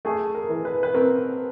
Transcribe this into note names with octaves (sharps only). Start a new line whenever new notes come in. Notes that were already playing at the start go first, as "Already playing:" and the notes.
A3 G#4
A#4
E3
B4
B4
C4 A#4